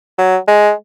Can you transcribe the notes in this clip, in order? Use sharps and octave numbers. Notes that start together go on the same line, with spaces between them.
F#3
G#3